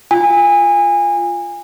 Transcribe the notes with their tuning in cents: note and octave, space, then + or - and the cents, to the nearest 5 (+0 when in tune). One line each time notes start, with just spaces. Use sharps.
F4 +0 G#5 -25